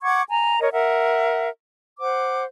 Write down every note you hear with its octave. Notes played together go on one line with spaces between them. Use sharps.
F#5 C#6 D6 G#6
G#5 A#5
A#4 C#5 D#5
A#4 E5 F#5
C5 F#5 D6